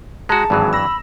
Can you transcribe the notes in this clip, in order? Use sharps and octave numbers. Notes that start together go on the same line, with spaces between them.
G#3 F#4 G#4 A5 A#5
G#1 G2 E3 F#3 G#4
B5 E6 A#6